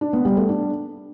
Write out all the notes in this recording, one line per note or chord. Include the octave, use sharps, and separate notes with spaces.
D4
B3
G3
A3
D4